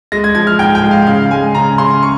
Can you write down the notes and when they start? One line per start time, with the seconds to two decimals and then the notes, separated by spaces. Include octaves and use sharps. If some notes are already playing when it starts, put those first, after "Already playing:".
0.12 G#3 A#6
0.24 G#6
0.35 F3 G#6
0.47 F6
0.59 G#2 G5
0.75 G5
0.83 G#3
0.91 F5
1.07 C#3 F5
1.30 G#3 G#5
1.55 C#3 A#5
1.78 C#3 C6
2.03 C#6